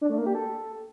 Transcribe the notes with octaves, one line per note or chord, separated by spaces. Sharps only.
D4
A3
A#3
G4
A4